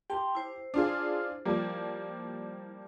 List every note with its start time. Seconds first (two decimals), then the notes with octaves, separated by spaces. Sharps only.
0.10 G4 G5 A5 C6
0.35 E4 C5
0.74 D4 F4 G#4
1.45 F3 G3 A#3